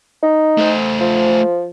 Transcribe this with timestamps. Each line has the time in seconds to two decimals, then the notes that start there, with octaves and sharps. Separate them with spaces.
0.23 D#4
0.58 A3 C5
1.00 F3